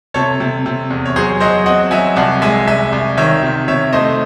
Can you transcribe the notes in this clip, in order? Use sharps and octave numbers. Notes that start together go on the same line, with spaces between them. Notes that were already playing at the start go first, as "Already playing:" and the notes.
C3 A4 C#5
C3
C3
E2
C#5
F#3 G#4 C5
F#3 C5 D#5
C4 D#5 F#5
F#3 E5 G#5
C2 F#5 A5
G#3 E5 G#5
C2 E5 G#5
C2
D#3 C#5 E5
C3
C3 C#5 E5
A3 C5 D#5